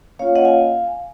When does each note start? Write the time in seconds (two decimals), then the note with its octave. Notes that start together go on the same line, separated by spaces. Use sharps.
0.19 A#3 C#4 F4 C#5 F5
0.36 D#5 F#5
0.45 F5 G#5